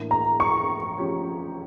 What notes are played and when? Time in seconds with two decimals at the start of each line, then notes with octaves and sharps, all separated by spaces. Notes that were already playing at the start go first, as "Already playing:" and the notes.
Already playing: A2 E3 A#3 D4
0.11 A#5
0.40 C#6
0.98 F3 C#4 G4 C#5